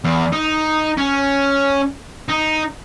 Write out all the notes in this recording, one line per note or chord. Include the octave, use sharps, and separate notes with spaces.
E2
D#4
C#4
D#4